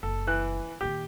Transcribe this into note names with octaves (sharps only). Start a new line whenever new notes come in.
F#1 A4
E3 F#6
A#2 D#3 G4